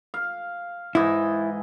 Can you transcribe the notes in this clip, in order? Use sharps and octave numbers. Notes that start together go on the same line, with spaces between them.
F5
G#2 E3 E4 D#5